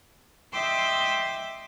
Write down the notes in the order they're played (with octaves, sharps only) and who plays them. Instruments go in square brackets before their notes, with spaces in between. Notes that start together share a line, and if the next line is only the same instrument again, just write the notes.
[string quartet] D#5 E5 G5 C6 D6 E6